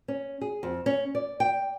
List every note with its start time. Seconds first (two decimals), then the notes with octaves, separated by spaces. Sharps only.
0.08 C#4
0.41 G#4
0.63 F2
0.86 C#4
1.15 D5
1.40 G5